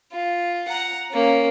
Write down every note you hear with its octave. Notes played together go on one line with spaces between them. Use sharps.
F4
F#5 A#5
A#3 C#4